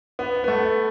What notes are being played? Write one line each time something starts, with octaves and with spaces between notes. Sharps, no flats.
B3
B3
A3